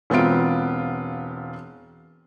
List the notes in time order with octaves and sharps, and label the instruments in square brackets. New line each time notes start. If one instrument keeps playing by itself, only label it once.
[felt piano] E1 B3 C4 F4 D7